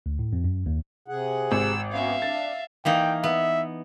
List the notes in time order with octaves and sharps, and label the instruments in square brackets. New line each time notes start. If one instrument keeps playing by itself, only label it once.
[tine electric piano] D2
A2
F2
F#2
D#2
[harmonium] C3 G#4 F#5
[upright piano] G#1 [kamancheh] E6
[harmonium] B3 C#4 F#4 [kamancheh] E5 F5
[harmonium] D4 [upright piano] A6
[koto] E3 A#3 D#4 [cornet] G5
[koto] B3 [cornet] E5